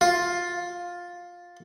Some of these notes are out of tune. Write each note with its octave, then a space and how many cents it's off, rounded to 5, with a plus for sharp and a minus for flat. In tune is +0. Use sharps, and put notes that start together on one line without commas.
F4 +10